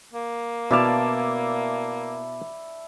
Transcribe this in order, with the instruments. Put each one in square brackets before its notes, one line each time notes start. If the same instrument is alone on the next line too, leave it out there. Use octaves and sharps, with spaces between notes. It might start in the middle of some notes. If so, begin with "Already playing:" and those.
[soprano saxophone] A#3
[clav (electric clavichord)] B2 F5 [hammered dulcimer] E4 D5 A5